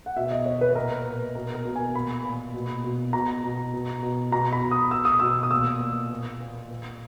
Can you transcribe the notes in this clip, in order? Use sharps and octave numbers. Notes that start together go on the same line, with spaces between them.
F#5
B2 E5
D#5
B2 C#5
B4
A#2 A#4
A#2
B2 A#4
A#4
B2
G#5
A#2 B5
A#2
B2
B2
B2 A#5
B2
B2
B2
B2 A#5
B5
B2
D#6
B2 E6
D#6
B2 E6
D#6
A#2 E6
A#2
A#2
A#2
A#2